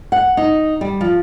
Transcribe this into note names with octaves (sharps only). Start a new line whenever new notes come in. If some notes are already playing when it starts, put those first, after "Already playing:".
F#5
D#4
G3
F3